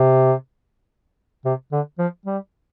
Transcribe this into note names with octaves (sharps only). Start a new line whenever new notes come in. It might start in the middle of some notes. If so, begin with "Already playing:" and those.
Already playing: C3
C3
D3
F3
G3